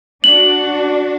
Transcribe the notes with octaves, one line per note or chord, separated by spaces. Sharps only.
D4 F#4 F#7